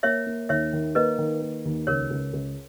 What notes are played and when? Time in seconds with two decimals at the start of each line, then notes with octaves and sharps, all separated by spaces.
0.03 A#3 C#5 E5
0.26 A#3
0.49 D#2 C#5 E5
0.73 D#3
0.95 A#3 B4 D#5
1.19 D#3
1.42 A#3
1.65 D#2
1.87 C#2 A#4 C#5
2.10 C#2
2.33 C#2